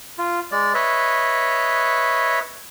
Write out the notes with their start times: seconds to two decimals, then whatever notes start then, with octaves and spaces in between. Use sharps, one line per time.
0.18 F4
0.52 G#3 D5
0.74 B4 C#5 D#5 E5